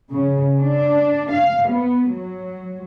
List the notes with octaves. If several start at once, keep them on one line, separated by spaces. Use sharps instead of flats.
C#3
D4
F5
B3
F#3